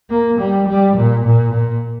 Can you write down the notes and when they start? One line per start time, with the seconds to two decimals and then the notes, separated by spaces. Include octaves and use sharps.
0.10 A#3
0.40 G3
0.68 G3
0.97 A#2
1.26 A#2
1.54 A#2